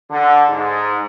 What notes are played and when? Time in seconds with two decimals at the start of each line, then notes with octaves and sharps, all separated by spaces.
0.10 D3
0.48 G#2